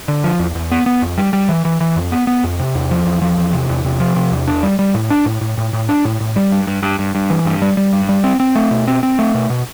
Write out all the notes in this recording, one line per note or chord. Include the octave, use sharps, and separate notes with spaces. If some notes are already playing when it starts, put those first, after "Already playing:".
D3
F3
E2
E2
B3
B3
F2
G3
G3
E3
E3
E3
F2
B3
B3
F2
C3
E2
F3
E2
F3
E2
C3
E2
C3
F3
C3
E2
D4
G3
G3
A2
D4
A2
A2
A2
A2
D4
A2
A2
G3
G2
G2
G2
G2
G2
E3
G2
G3
G3
G2
G3
C4
C4
A3
B2
C4
C4
A3
B2
B2